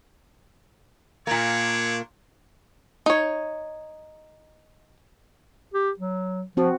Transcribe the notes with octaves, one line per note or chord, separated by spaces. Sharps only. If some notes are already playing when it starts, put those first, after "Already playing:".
A#2 A#3 C4 D4 C#5
D#4 C#5
G4
F#3
F3 C4 F#4